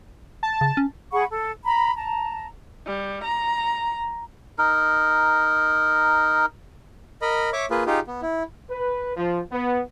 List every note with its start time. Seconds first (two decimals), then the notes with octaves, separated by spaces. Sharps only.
0.43 A5
0.61 C#3
0.77 C#4
1.12 G#4 F#5 B5 C#6
1.29 A4
1.64 A#5 B5
1.96 A5 A#5
2.86 G3
3.24 A#5
4.58 D#4 A#4
7.22 A#4 D#5 B5
7.53 C#5 E5 C#6 D6
7.70 A#3 F4 G#4 B4
7.86 D#4 F4 G4 G#4
8.07 B3
8.22 E4
8.70 B4
9.17 F3
9.52 B3